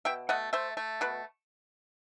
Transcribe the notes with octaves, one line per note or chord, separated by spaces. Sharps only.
B2 E5 G5
A3 D#5 F#5
A3 C5 E5
A3
B2 B4